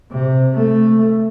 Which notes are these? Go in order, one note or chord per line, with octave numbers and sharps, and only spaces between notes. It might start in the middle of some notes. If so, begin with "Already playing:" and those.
C3
A3